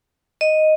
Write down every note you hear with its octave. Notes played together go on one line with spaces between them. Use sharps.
D#5